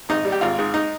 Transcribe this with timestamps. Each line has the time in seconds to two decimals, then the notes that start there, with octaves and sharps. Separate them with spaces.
0.09 G#1 D#4
0.25 G3
0.32 G4
0.41 G#1 F4
0.59 G#2
0.74 D#4